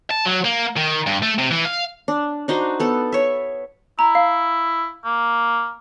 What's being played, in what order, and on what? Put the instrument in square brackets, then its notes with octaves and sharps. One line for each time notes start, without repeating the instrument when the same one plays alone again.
[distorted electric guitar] A5
F#3
A#3
D#3
G2
A3
C3
E3
F5
[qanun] D4
D4 D#4 F#4 C5
B3 A4
C#5 E5
[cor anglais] E4 [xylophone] A#5
[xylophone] F5
[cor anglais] A#3